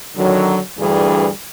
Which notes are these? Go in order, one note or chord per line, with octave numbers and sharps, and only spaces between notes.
D3 D#3 F#3
D2 G2 E3 G3 G#4